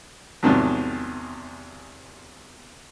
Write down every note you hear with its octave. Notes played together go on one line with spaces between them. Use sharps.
E2 G#2 C3 D#3 F3 F#3